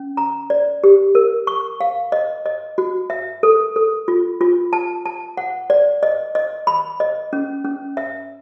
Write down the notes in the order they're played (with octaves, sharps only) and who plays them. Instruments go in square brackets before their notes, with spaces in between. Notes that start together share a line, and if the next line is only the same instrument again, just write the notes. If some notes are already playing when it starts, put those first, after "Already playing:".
Already playing: [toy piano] C#4
A#5
D5
G4
A#4
C#6
F5
D#5
D#5
F#4
E5
A4
A4
F4
F4
A5
A5
F#5
D5
D#5
D#5
B5
D#5
C#4
C#4
E5